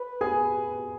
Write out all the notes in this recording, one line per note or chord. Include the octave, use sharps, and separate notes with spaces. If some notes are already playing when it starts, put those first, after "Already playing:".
Already playing: B4
G#4 G#5